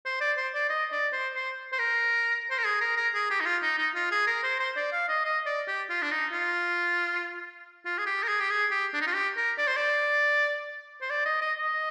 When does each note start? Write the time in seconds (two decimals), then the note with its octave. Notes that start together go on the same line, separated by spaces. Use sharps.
0.06 C5
0.21 D5
0.37 C5
0.54 D5
0.69 D#5
0.92 D5
1.13 C5
1.35 C5
1.73 C5
1.79 A#4
2.50 C5
2.58 A#4
2.66 G#4
2.81 A#4
2.97 A#4
3.14 G#4
3.31 G4
3.40 D#4
3.46 F4
3.62 D#4
3.78 D#4
3.95 F4
4.11 G#4
4.27 A#4
4.44 C5
4.60 C5
4.76 D5
4.92 F5
5.09 D#5
5.24 D#5
5.46 D5
5.68 G4
5.90 F4
6.02 D4
6.11 D#4
6.33 F4
7.85 F4
7.98 G#4
8.06 G4
8.23 A#4
8.28 G#4
8.40 G4
8.50 G#4
8.71 G4
8.94 D4
9.01 D#4
9.07 F4
9.14 G4
9.37 A#4
9.58 D5
9.67 C5
9.76 D5
11.02 C5
11.10 D5
11.25 D#5
11.41 D#5
11.58 D#5